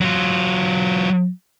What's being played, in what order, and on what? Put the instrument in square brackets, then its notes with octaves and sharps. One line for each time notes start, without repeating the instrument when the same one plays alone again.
[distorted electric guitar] F#3 F4